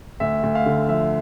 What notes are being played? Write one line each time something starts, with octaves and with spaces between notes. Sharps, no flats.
D2 E5
D2
F5
D3
F3 E5